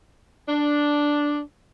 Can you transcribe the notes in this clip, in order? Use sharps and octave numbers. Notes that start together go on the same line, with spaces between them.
D4